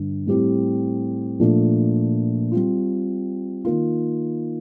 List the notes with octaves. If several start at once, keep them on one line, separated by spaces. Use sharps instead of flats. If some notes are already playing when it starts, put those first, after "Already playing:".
Already playing: G2 D3
A2 G3 C4 G4
A#2 F3 A3 D4
G3 C4 F4
D#3 A#3 F4